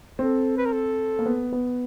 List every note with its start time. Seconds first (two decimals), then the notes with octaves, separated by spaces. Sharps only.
0.19 C4 A4
0.57 B4
0.65 A#4
0.72 A4
1.19 A#3
1.26 B3
1.53 B3